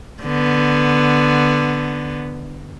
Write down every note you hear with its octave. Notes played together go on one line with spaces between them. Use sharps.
D3 B3